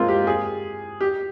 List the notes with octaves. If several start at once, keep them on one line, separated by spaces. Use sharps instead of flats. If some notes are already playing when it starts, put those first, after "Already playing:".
Already playing: G#3 A#3 C4 F4
G4
G#4
G4